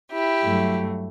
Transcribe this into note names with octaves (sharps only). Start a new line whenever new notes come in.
E4 G4
G2 F#3 A3